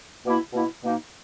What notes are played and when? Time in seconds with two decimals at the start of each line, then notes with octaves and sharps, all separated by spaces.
0.24 B2 A#3 E4
0.53 B2 A#3 E4
0.82 B2 A#3 D#4